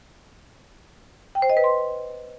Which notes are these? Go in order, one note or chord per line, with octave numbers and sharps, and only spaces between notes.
G5
C5
D#5
B4
C6